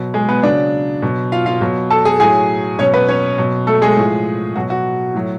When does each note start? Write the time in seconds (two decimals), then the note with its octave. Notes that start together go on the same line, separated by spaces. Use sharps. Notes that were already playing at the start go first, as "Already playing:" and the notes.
Already playing: B2 F#3
0.14 G#3 G#4
0.29 B3 B4
0.43 C#3 F#3 D4 D5
1.02 B2 F#3
1.32 F4 F5
1.46 F4 F5
1.61 B2 F#3
1.90 A4 A5
2.05 G#4 G#5
2.20 A2 F#3 G#4 G#5
2.79 B2 F#3 C#4 C#5
2.94 B3 B4
3.09 C#4 C#5
3.38 B2 F#3
3.67 A3 A4
3.82 G#3 G#4
3.97 A2 F3
4.56 B2 F#3 F#4
4.70 F#4
5.14 A2 F#3